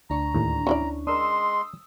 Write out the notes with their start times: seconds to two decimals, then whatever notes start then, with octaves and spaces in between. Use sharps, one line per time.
0.10 D2 D4 A#5 C#6
0.35 D#2 A2
0.67 C#4 E4 D5
1.07 G#3 D4 A#4 C6 D#6 E6